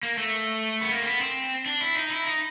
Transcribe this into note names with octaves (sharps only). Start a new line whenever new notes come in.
A#3
A3
B3
A#3
C4
B3
C4
D4
E4
D#4
E4
D#4